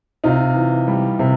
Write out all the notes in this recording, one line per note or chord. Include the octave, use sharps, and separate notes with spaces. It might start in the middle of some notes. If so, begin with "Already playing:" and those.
C3 D#4 F4
E3
G3
C3